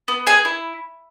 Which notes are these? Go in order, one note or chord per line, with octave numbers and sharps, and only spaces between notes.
B3
G#4 G#5
E4